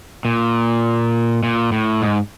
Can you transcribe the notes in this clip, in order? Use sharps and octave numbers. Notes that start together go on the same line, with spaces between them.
A#2
A#2
A2
G#2